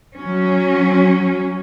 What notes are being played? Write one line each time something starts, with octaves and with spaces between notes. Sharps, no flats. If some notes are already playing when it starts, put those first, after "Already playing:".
F#3 C#4